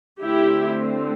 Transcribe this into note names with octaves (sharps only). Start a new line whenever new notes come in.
D3 A3 C4 E4 G4